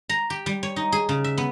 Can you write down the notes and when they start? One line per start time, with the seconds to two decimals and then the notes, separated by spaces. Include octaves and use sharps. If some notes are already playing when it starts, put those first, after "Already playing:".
0.09 A#5
0.30 G4
0.46 G3
0.63 C#5
0.76 D#4
0.92 G#4
1.09 C#3
1.24 E5
1.38 B3